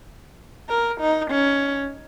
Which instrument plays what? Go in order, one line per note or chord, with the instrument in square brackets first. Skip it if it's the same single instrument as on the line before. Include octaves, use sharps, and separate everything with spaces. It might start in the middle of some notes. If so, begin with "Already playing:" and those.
[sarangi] A#4
D#4
C#4